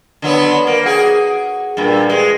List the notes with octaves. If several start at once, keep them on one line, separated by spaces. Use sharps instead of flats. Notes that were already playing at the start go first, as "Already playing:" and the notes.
D3 F#3 B3
A#3
F#4 G#4
G2 A#2
G#3